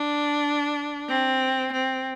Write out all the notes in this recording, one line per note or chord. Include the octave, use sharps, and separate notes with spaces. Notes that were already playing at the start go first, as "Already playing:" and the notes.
Already playing: D4
C4
C4